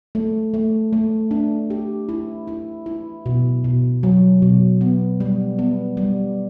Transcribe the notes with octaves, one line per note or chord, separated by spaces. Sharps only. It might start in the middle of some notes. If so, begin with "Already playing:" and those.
A3
A3
A3
D4
G4
E4
E4
E4
B2
B2
F#3
B2
B3
G3
B3
G3